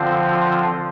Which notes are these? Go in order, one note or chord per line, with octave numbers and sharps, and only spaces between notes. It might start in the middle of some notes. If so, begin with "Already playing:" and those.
Already playing: D3 F3 C4 F4 C5